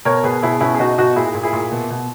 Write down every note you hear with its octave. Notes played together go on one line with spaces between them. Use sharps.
B2 A#4 C#5
B2 G#4 B4
B2 E4 G#4
B2 C#4 E4
G#4
B2 D#4 F#4
B2 D#4 F#4
A#2 E4 G#4
A#2
E4 G#4
A#2
B2
B2